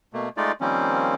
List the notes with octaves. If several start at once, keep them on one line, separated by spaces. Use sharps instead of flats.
B2 A3 A#3
G#3 A3 D#4 F4 D5
D#3 F3 G3 A#3 C4 C#4